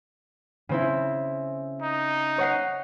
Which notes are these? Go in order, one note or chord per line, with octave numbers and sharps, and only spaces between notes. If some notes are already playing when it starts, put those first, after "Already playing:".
C#3 C4 E4
D#4
C#5 F#5 C7